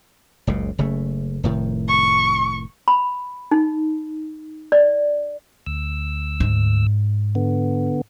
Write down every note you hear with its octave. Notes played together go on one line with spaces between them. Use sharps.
F#1 C#2 C#3
F#1 C#3 A3
F1 A2 D#3
C#6
B5
D#4
D5
D2 E6
G#2
D3 B3